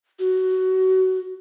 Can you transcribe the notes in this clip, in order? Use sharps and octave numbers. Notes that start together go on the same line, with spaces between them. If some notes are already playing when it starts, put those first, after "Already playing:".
F#4